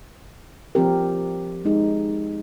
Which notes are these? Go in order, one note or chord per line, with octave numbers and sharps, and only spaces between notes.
F3 C4 G4 A#4
G#3 D#4 G#4